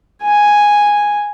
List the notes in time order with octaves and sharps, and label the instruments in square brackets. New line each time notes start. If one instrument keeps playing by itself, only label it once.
[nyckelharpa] G#5